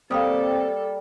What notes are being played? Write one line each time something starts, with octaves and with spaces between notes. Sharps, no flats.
G3 A#3 C4 A4 F5 G5 D#6